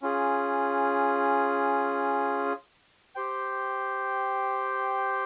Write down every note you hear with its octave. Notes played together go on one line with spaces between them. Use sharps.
C#4 F4 G#4
G4 C5 G5